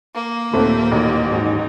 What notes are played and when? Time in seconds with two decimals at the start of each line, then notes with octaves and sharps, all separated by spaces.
0.15 A#3
0.53 D#2 A#2 A3 C4 G4 A4 C#5 F#5
0.92 A1 D#4 F#4 C#5
1.31 G#2 C#4 D#4 F#4